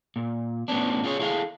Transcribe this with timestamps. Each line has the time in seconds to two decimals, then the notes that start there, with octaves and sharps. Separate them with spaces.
0.16 A#2
0.68 A2 B3 C#4 D4
1.04 C#4 F4 G#4 C5 C#5
1.19 E4 G#4 A4 D5 F5